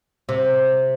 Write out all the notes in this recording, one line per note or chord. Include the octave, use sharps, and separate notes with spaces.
C3